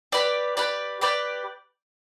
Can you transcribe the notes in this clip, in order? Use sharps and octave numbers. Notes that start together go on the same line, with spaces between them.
G4 B4 D5 G5
G4 B4 D5 G5
G4 B4 D5 G5